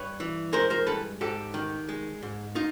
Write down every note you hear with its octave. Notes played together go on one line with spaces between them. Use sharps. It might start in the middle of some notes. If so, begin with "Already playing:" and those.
Already playing: G2 B4 C#5
E3
G#3 A#4 C5
A#4 C5
G2 A4 B4
G#2 G4 A4
D#3
G#3
G#2
D#4 F4